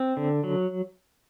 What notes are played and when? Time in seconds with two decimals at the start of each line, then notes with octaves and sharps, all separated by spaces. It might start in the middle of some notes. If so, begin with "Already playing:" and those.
Already playing: C4
0.17 D3
0.44 F#3